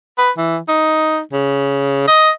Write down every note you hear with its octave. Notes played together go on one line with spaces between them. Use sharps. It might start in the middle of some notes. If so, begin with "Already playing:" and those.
B4
E3
D#4
C#3
D#5